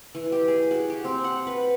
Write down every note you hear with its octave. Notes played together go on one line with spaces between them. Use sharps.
E3
G4
G#4
F#4
G4
C4
F#5
B4